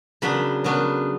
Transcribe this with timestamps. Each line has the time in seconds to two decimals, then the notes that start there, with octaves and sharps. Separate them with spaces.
0.22 C#3 F#3 B3 D4 B5
0.64 C#3 F#3 B3 D4